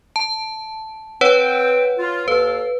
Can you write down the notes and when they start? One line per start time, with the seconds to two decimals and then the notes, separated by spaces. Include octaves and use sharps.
0.16 A5
1.21 C4 B4 C#5 F#5 G5
1.98 F4
2.28 D#2 A4 B4 F5